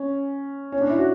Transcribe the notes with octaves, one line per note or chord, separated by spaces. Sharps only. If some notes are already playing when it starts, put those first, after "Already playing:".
Already playing: C#4
C#4
D4
E4
F#4